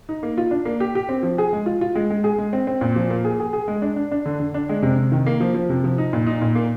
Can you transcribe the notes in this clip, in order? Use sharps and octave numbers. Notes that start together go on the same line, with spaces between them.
D#4
A#3
F4
D4
A#3
G4
G4
C4
F3
G#4
G#3
F4
F4
G#3
G#3
G#4
G#3
C4
C4
A#2
F3
A#3
G#4
G#4
G#4
G#3
D4
D4
D4
D3
D3
D4
G#3
C3
C3
D#3
A#3
F3
F3
C3
F3
D#4
A#2
D#4
A#2
A#3